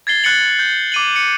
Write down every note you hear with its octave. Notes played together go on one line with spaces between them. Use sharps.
G#6 A6 C7 G7
F#6 A6 C#7 F#7
G6
D6 D#7 F#7
C#7